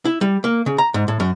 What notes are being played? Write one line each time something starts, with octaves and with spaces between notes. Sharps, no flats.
E4
G3
A#3
C#3
A#5
G#2
A2
F#2